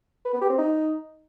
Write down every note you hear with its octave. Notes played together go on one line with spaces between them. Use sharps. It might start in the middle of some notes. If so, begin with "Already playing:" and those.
B4
B3
G4
C4
D#4